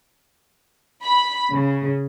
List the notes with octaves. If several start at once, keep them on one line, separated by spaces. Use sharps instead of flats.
B5
C#3